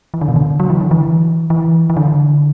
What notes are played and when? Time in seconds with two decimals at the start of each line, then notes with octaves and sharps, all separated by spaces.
0.14 E3
0.21 D3
0.29 B2
0.36 D3
0.60 F#3
0.70 E3
0.81 D3
0.91 E3
1.50 E3
1.90 E3
1.97 D3